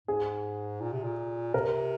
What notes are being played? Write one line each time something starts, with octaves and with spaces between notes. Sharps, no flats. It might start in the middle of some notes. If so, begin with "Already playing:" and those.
G#2 G#4
A#2
C3
A#2
C3 A#4